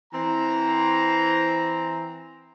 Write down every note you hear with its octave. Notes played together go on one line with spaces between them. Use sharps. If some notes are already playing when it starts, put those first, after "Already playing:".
E3 C4 A#5